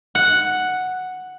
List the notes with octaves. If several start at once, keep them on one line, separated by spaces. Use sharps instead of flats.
F#5